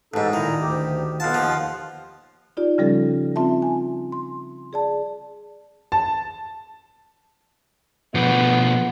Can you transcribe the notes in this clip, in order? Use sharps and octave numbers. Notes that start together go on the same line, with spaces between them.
A1 G#2 D#4 A4
A#2 D#3 E4 A#5
D2 G4
B1 F4 F5 F#5 A5
D#2 F3
D#4 F4 G4 D5
C#3 F3 G3 C#4 G4 A4
C4 F4 E5 A5
G#5
C6
G#4 D5 A5
A5
B2 F3 B3